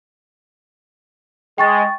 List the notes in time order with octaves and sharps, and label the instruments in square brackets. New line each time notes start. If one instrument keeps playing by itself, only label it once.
[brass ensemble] G#3 [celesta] G5 C#6 A6